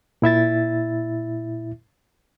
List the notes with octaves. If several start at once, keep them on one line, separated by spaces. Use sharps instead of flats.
A#2 E4 E5 A6